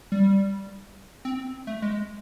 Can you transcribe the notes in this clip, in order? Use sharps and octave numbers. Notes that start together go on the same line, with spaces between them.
G3
C4
A3
G#3